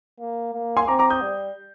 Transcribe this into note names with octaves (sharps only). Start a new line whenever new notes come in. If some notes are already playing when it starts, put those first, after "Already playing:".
A#3
A#3
G#5 C6
C4 A#5 D6
A#5 D6
D#6 G6
G3